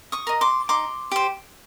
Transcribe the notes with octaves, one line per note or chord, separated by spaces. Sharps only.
C#6 D#6
A#4 D#5
C6 D6
D#4 C6 D6
G4 C5